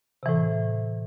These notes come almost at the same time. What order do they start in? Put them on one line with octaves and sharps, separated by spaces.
C3 E3 A2